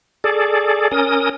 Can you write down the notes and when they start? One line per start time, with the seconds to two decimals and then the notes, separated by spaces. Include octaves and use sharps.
0.24 G#4 A4 D5
0.91 C#4 A#4 D#6